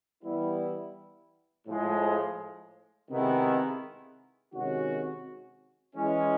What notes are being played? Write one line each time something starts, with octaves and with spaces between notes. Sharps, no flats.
E3 G3 B3 E4
A2 F3 G#3
C3 D#3 G#3 B3 E4
C3 D#3 G#3 C#4 F#4
E3 G#3 C#4